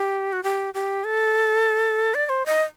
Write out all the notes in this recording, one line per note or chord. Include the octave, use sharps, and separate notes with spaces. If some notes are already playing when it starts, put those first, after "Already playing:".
Already playing: G4
F#4
G4
G4
A4
D5
D5
C5
D#5